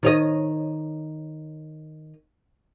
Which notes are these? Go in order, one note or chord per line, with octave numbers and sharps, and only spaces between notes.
D#3 C#5 D#5